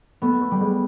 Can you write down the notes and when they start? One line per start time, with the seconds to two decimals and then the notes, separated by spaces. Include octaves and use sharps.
0.22 A3 B3
0.41 A3
0.51 G3
0.61 G#3